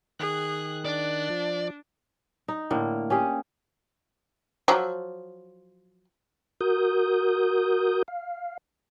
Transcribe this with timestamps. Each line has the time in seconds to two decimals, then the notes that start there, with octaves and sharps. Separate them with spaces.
0.19 D#3 G#4 F#6
0.85 D4 D5
1.30 F3
2.48 D#4
2.70 A2 D3 A#3
3.10 C#4 G4 G#4
4.68 F3 F#3
6.61 F#4 A#4 D#6 G6
8.08 F5